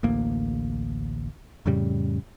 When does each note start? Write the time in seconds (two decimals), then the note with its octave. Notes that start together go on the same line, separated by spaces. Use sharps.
0.03 A1 D2 A#3
1.66 F2 A2 C#3 G3